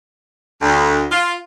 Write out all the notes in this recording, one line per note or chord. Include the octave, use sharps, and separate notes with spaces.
D2
F4